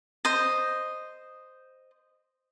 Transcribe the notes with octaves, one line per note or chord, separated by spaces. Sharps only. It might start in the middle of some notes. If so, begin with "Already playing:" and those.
C5 D#5